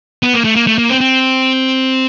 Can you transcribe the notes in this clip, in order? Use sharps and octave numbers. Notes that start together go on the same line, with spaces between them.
B3
A#3
A3
A#3
A3
A#3
C4
C4